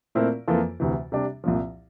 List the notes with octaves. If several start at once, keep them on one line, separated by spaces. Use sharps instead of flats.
A#2 A3 C4 E4 A#4
F2 E3 A#3 F4 A4
D2 C3 E3
C3 G3 D4 G4
C2 A#2 F3